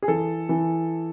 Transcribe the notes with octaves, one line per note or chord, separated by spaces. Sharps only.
G#4
E3 A4
E3